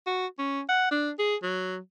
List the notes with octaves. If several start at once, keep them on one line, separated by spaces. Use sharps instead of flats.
F#4
C#4
F#5
D4
G#4
F#3